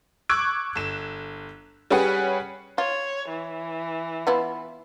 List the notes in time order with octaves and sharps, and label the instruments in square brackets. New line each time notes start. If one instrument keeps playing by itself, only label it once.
[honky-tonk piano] C#6 D6 E6 F#6 G#6 D7
G1 E7
G3 C#4 G4 G#4 B4 F#5
[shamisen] F4 [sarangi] C#5
[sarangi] E3
[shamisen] B3 E4 F4